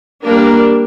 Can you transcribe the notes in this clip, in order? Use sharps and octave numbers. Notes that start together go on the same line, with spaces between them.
G3 A#3 D4 A#4